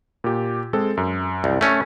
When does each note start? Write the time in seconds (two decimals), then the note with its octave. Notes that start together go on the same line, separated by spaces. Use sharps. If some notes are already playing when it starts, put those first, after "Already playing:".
0.24 A#2 G4
0.73 G#3 C4 A4
0.97 F#2
1.44 C2
1.61 A3 C#4